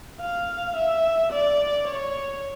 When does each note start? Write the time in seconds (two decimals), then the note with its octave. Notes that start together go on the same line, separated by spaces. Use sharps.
0.21 F5
0.76 E5
1.33 D5
1.88 C#5